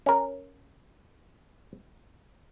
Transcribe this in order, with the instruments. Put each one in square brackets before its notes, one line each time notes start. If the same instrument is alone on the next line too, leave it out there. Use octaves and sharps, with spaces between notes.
[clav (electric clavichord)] C#4 A#4